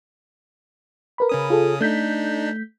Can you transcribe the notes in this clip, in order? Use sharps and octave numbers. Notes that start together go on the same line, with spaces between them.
A#4 B4 B5
C#3 C#4 D#6
F4 G#4 A4
A3 D4 D#4 G6 B6